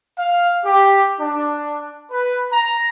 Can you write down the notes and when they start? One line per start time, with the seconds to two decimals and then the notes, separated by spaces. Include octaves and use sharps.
0.19 F5
0.65 G4
1.20 D4
2.12 B4
2.52 A#5